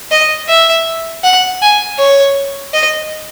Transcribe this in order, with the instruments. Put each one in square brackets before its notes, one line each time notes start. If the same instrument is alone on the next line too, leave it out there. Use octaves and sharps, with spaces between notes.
[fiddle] D#5
E5
F#5
G#5
C#5
D#5